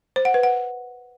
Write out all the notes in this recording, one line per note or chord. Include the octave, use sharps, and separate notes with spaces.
C5
F#5
B4
F#5